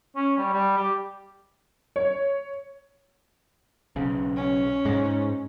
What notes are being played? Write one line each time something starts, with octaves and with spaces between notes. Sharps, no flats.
C#4
G3
G3
G4
C#5
B1 C#3
C#4
G#2 G#3